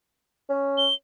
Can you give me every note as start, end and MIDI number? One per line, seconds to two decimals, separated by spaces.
0.50 0.87 61
0.77 0.94 103